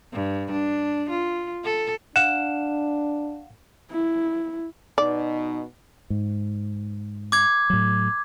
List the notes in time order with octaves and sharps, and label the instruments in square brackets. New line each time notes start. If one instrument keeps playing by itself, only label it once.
[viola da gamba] G2
D4
F4
A4
[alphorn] D4 [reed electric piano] F5 F#5 [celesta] E7
[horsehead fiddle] E4
[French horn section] B2 D#4 [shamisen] D5
[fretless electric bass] G#2
[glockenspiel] D6 G#6
[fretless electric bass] A2 F#3